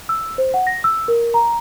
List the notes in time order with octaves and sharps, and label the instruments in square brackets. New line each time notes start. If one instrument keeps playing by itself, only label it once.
[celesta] E6
C5
F#5
A#6
E6
A#4
A#5